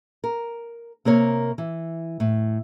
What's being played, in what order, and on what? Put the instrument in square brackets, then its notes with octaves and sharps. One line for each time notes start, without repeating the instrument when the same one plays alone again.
[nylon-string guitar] A#4
C3 A#3 A#4 C#5
E3
A2